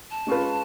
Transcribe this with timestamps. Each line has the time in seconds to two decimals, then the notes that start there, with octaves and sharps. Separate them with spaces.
0.11 A5
0.27 G#3 C#4 F4 B4